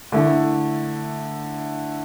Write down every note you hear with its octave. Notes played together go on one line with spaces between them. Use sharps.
D3 A3 E4